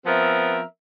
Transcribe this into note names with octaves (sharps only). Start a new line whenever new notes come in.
F3 B3 C4 A#4 E5